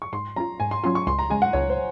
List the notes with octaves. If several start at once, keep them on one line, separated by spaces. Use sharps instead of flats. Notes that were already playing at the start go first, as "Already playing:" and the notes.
C#6
G#2 C6
F#3 C#4 F4 A#5
G#2 G#5
C6
F#3 C#4 F4 C6
C#6
C#2 C6
A#5
C#3 G#3 G#5
F#5
C#2 C#5
C5